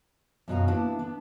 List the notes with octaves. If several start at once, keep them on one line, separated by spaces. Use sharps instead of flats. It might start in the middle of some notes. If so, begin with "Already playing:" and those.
F#2 B2 F#4 D#5 F5 A#5
A#3 B3 D4 E4 B4
B3 D4